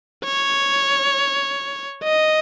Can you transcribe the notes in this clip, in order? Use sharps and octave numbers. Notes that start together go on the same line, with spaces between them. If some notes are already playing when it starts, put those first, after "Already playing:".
C#5
D#5